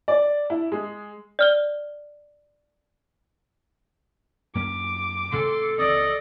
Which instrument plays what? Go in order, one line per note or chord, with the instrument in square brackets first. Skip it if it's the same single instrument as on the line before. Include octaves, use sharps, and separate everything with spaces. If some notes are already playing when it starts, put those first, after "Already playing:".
[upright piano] D5
E4
G#3
[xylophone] D5 F6 G7
[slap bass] F#2 A#3 C#4 [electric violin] D6
[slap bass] A1 D2 C3 [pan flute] A4 [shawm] C6
[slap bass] C#2 E3 C4 [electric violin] D5 [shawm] D#5